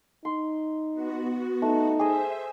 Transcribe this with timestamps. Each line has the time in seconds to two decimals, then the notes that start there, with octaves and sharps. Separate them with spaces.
0.25 D#4 C6
0.93 B3 F#4
1.62 A3 D#4
1.99 G#4 C5 D#5 E5